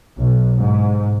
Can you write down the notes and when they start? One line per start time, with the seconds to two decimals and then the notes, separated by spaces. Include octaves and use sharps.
0.18 B1
0.59 G#2